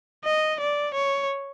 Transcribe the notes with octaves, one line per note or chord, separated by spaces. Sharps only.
D#5
D5
C#5